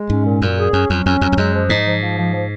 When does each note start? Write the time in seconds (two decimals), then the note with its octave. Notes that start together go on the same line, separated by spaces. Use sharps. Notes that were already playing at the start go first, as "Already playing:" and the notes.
Already playing: G#3
0.09 G#2 C#4
0.25 A#2
0.42 F#2 A#2
0.58 G#4
0.73 F#2 C#4
0.90 F2 F#3
1.06 F2 C#4
1.21 F2 F#3
1.32 F2
1.37 F#2 G#3
1.54 F3
1.69 G#2 D#4
1.86 F3
2.01 F3
2.18 F3
2.34 F3